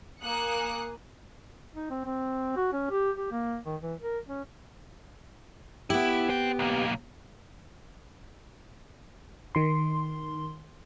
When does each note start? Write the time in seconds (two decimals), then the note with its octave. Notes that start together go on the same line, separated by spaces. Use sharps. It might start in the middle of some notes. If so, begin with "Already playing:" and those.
0.22 A#3 G#5 D#6 F#6 C#7
1.75 D#4
1.90 C4
2.05 C4
2.56 F#4
2.73 C#4
2.90 G4
3.16 G4
3.31 A#3
3.66 D#3
3.82 E3
4.00 A#4
4.28 C#4
5.90 B3 E4 G4
6.29 C5 G5
6.59 B1 A#3
9.55 D#3 C6